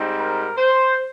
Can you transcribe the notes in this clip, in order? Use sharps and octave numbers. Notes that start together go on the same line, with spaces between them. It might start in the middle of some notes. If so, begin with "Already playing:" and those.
Already playing: G#2 G3 C4 D#4
A#4
C5